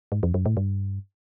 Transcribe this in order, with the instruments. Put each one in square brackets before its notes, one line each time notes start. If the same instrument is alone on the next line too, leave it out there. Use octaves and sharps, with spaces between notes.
[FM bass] G#2
F2
F#2
A2
G2